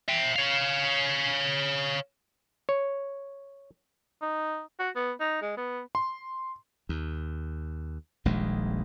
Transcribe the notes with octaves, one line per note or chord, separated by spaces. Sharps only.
E5 G5
C#5 F5
C#5
D#4
F#4
B3
D#4
G#3
B3
C6
D#2
D#1 A#1 D#2 G#3